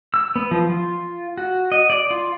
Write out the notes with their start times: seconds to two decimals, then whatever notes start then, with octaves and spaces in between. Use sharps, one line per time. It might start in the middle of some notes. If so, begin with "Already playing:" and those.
0.14 E6
0.36 B3
0.51 F3
0.70 F4
1.37 F#4
1.72 D#5
1.90 D5
2.11 F4